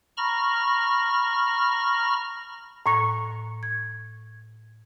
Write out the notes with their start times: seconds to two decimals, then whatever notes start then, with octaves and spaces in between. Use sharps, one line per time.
0.17 A#5 B5 C#6 F6 A#6
2.86 A2 A#5 C#6
3.63 G#6